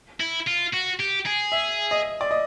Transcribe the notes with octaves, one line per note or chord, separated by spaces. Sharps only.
E4
F4
F#4
G4
G#4
E5
D#5
D5
D#5